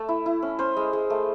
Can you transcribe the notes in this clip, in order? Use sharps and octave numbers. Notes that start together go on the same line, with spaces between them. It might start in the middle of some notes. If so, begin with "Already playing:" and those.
Already playing: A3 A5
E4
E4
C#4
C#4 C5
G#3
G#3
A3